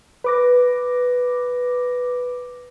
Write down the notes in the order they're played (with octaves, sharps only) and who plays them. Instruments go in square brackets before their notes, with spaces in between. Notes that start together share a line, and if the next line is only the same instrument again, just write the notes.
[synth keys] B4 D6 A#6